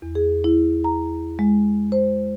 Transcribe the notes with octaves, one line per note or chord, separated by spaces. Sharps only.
E2
G#4
E4
A#5
G#3
C5